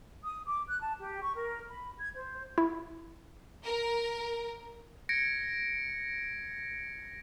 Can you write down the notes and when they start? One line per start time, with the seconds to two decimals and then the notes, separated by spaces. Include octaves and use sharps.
0.23 D#6
0.45 D6
0.69 F#6
0.81 A5
0.99 G4
1.21 C#6
1.35 A#4
1.69 B5
1.98 G#6
2.14 C5
2.58 E4
3.65 A#4
5.09 G#6 A#6 C#7 D7